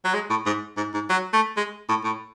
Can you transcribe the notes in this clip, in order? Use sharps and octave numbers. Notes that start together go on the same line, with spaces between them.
F#3
G#3
A2
G#2
G#2
G#2
F#3
A3
G#3
A2
A2